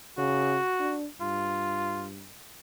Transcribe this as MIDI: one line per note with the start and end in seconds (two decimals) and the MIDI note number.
0.18 0.58 49
0.18 0.95 66
0.80 1.07 62
1.21 2.29 43
1.21 2.07 65